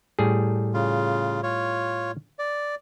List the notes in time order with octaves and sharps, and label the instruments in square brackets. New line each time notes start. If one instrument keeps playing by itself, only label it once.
[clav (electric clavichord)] A2 G3 G#4
[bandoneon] C#3 F4
F4 C#5
D5